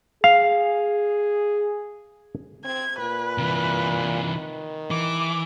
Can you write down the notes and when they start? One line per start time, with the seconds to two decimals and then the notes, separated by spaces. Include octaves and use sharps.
0.24 G#4 F5
2.65 C4 G#6
2.99 A#2 B4
3.38 C3 E3
4.24 D#3
4.91 E3 D6